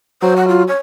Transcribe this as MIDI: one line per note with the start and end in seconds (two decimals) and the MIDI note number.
0.22 0.66 54
0.22 0.34 72
0.36 0.48 78
0.48 0.63 65
0.68 0.78 73